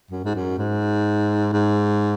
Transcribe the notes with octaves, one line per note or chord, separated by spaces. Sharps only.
F#2
G#2
F#2
G#2
G#2